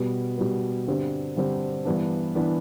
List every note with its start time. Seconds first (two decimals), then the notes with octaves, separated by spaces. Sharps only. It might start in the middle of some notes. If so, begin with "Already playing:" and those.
Already playing: B2 G3 B3
0.38 B2 G3 B3
0.87 G2 D3 G3 C4
1.36 G2 D3 G3 C4
1.85 G2 E3 B3 D4
2.35 E3 B3 D4